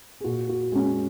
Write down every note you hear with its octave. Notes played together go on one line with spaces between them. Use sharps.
G#4
A#2 F#4
F#4
G#3 C#4 G#4